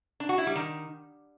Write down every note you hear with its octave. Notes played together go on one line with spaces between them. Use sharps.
D4
F#4
E4
G3
D#3